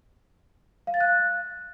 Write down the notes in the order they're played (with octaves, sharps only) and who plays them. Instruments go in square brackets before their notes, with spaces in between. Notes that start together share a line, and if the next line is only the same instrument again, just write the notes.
[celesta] F5
A6
F#6